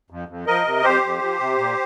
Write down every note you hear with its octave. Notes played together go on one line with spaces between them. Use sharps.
F2
F2
F3 A#4 D#5
C3
F2 G4 C5
F2
F3
C3
A#2